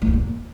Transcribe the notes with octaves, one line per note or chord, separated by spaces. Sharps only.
A2
E2
A#2